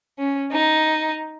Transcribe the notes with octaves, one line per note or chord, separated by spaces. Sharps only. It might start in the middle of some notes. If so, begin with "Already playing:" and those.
C#4
D#4